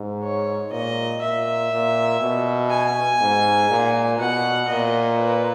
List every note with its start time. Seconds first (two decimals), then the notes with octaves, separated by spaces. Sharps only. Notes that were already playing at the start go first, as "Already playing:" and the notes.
Already playing: G#2
0.23 C#5
0.72 A#2 D#5
1.22 A#2 E5
1.72 A#2
2.21 B2
2.70 G#5
3.21 G#2
3.70 A#2
4.18 B2 F#5
4.68 A#2 D#5
5.18 B4